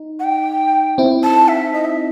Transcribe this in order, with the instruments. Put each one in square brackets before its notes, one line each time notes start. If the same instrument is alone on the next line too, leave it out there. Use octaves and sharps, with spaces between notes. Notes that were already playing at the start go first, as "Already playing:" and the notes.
Already playing: [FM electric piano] D#4
[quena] F#5
G5
[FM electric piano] C4 E4
[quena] A5
E5
D#5
E5